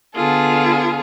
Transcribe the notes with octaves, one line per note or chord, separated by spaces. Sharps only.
D3 B3 F4 G#4 A4